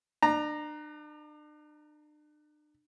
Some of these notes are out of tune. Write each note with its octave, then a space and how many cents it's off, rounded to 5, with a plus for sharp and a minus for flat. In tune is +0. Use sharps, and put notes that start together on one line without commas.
D4 +40 A#5 +0